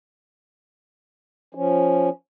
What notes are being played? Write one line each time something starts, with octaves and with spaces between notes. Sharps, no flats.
F3 C#4